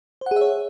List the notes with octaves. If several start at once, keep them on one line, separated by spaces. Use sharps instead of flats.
G#4 C5 C#5 E5 F#5